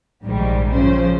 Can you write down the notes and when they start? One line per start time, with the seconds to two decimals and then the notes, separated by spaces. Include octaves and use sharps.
0.24 A#1 G#2 D#3 G3
0.73 C#3 F3 C5